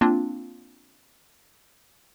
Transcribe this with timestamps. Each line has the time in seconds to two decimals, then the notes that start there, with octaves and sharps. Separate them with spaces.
0.01 A#3 C4 D4 F4